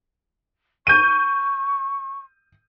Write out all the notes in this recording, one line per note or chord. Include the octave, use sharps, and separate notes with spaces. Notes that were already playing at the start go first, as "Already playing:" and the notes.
C#6 G6 D#7